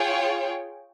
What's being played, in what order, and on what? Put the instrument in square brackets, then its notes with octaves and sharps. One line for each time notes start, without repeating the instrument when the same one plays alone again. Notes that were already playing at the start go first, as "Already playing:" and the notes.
Already playing: [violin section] F4 G#4 C#5 G5